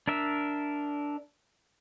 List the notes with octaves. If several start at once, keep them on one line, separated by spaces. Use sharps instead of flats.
D4 A#4 E5